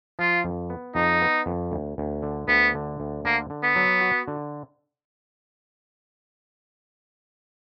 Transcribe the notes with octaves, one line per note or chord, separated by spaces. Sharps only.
F3 F4
F2
B3
F2 D#4
B3
F2
D2
D2
D3
D2 B3
D3
D2
D3 A#3
D3
B3
F#3
F#4
D3